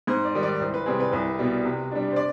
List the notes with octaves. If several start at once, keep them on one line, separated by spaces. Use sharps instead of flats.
G#2 C5
D5
D#3 G3
D5
C2 C5
B4
C3 G3 C4 G#4
B4
C2 B4
B2 G3
C3
G3 D4
C5
D5